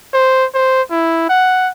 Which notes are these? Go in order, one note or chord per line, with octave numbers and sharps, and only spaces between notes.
C5
C5
E4
F#5